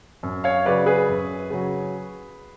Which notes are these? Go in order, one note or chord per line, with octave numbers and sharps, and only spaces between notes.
F#2
C#5 F5
C#3 F#3 B4 D5
G#4 B4
F#2
C#3 F#3